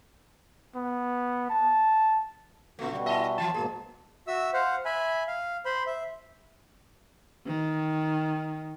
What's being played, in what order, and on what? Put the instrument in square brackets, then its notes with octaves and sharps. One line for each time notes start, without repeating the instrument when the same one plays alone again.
[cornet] B3
A5
[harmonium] A#2 B3 F#4 [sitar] C#3 A3
[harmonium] B2 G3 F#4
[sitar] E4 D#5 [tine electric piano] E5 G#5 A5
[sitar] E3 F4 [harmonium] F#3 [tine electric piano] A5
[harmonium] G#2 B2 A#3 [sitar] G#4
[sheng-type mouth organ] F#4 E5 E6
C5 F5 F#5
E5 G#5 B5
F5
C5 B5 C6
E5
[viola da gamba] D#3